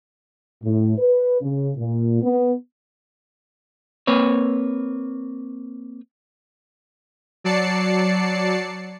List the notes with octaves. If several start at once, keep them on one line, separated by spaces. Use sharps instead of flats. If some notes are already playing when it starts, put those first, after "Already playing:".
A2
B4
C#3
A#2
B3
A#3 C4 B4 C#5
F#3 D5 A5 C7 C#7